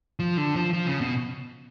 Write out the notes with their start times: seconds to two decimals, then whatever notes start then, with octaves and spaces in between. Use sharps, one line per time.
0.19 F3
0.37 D3
0.56 F3
0.73 F3
0.87 C#3
1.01 B2